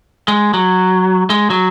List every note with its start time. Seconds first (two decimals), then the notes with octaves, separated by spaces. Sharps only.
0.28 G#3
0.54 F#3
1.30 G#3
1.50 F#3